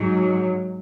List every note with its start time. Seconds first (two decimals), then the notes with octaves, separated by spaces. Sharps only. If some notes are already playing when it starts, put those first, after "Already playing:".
Already playing: G#2 F#3